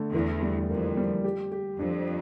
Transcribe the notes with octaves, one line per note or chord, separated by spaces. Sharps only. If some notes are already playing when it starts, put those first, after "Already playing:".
Already playing: D3 A3
E2 E3
G3
F2 A#3
G3
G4
G4
F2 D4